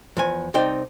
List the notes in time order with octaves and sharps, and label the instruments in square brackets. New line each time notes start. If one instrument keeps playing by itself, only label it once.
[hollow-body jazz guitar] E2 F3 G#5
C2 C4 D#4 D5 G5